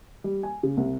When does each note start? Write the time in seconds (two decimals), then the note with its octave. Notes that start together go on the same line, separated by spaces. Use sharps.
0.24 G3
0.43 G#5
0.63 C#3
0.77 C2